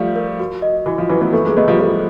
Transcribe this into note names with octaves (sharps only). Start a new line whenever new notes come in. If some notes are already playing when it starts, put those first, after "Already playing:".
Already playing: F3 G3 A3 D5 F5
A#4
F#4
D#5
E3 F#4
F3
E3 F#3 B4
A3 B3
A3 B3 A4
G#3 A#3
A3 B3 D#5
F3 G3
F3 A4